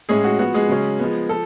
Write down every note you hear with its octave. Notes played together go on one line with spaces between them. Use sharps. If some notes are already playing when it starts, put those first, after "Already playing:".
A2 G#3 C#4 G#4
F#4
F3 B3 F#4
G#3 G#4
C#3 F#3 C#4
F3 G#3 B3
F3 A4